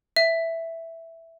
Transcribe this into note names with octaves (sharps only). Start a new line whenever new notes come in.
E5